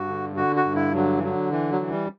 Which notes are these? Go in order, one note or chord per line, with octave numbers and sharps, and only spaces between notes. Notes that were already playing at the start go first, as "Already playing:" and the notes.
Already playing: G2 F#4
D3
D3 F#4
F#4
G2
E4
D3 F#3
E3
D3 F#3
E3
F#3
E3
G3